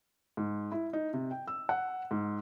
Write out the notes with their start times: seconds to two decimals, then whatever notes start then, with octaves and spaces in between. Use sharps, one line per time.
0.37 G#2
0.72 E4
0.93 D#4
1.13 C3
1.31 G5
1.47 E6
1.69 F#5
2.11 G#2